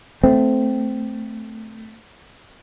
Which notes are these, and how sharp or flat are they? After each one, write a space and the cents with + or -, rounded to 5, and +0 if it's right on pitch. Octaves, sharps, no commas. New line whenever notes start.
A3 +0 C4 -10